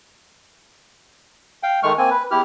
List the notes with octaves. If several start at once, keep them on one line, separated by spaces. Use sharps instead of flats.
F5 G5
D#3 G#3 A3 C#6 F6
A#3 C4 G#5
B4
E2 E4 G4 F6